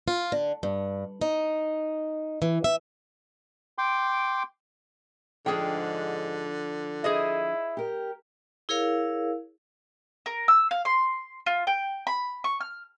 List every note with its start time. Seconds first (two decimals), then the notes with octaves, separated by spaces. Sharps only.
0.08 F4
0.32 D3
0.63 G2
1.21 D#4
2.42 E3
2.64 E5
3.78 G5 C6 D6
5.46 G#2 D3 F3 D4 G#4 G5
7.04 E4 G#4 C5 D#5
7.77 G4 A#4
8.69 E4 G#4 A#4 C#5 F5
10.26 A#4
10.48 E6
10.71 F5
10.85 C6
11.46 F4
11.67 G5
12.07 B5
12.44 C#6
12.60 F6